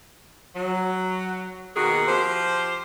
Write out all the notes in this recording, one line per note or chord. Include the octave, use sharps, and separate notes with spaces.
F#3
B2 D#3 A#3 F#4 G#4
F3 G4 C5